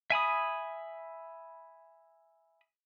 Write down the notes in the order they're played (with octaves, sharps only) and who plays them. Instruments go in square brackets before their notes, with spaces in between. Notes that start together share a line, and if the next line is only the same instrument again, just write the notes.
[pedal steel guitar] E5 G#5 B5 D#6